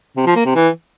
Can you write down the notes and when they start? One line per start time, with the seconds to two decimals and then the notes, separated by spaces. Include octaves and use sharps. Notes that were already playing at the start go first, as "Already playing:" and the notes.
0.17 C3
0.26 F3
0.36 A#3
0.45 C3
0.55 E3